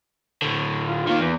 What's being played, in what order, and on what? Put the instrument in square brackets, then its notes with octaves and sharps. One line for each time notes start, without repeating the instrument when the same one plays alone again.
[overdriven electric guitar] A2 D3
[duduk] F4
[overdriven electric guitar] D#3 A#3 [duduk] F4
[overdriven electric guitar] E2 [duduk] E3